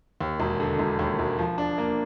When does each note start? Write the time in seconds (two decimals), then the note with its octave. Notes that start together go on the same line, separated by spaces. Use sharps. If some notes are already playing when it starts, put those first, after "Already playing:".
0.21 D#2
0.40 E1
0.60 D3
0.79 E1
0.99 D#2
1.19 E1
1.38 F3
1.58 D4
1.78 A#3